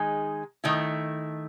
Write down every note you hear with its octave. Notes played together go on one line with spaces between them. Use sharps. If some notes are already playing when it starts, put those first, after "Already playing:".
Already playing: D#3 G#3 D#4 G#4
D#3 A3 E4